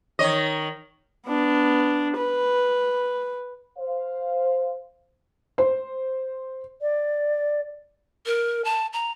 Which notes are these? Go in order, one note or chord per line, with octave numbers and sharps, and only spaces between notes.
D#3 C#5 D#5
B3 D4
B4
C5 F5
C5
D5
A#4
A5
A#5